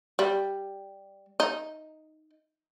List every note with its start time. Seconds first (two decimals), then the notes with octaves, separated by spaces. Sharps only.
0.19 G3
1.40 D#4